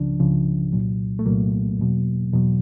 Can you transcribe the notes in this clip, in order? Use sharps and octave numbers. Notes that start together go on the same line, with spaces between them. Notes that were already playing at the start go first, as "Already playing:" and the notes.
Already playing: C#2 C#3 F3 D4
C#2 C#3 F3
C2 A#2 F#3
A3
C2 A#2 F#3 A#3
E2 B2 F#3
E2 B2 F#3